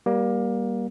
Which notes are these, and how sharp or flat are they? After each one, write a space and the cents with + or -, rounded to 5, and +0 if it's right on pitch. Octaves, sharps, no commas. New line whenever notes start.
G3 -5 A#3 +25